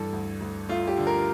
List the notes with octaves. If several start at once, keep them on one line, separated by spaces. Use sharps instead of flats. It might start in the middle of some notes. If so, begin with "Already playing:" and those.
Already playing: G2 E3 A4
D2
D2
A3 F4
G4
D3
A#4